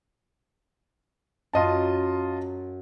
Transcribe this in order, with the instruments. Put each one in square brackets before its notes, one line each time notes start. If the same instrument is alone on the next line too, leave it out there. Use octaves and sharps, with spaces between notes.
[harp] F#2 [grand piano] F4 D#5 A5